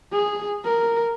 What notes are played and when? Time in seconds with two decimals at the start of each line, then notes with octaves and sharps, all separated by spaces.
0.12 G#4
0.65 A#4